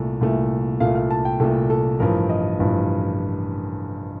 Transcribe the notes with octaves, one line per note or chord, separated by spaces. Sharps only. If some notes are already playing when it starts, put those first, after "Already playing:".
Already playing: C2 A#2 A3
C2 A#2 A3
C2 A#2 A3 F5
F5
A5
G5
C2 A#2 A3 A4
A4
A1 G2 F3 A#4
D#5
A1 G2 F3